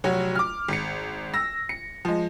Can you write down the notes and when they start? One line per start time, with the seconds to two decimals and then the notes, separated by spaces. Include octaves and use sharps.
0.04 F1 F#3 F#4 C#5
0.35 D6 F6
0.68 G#1 C#7
1.34 E6 A#6
1.69 C#7
2.05 F3 G#3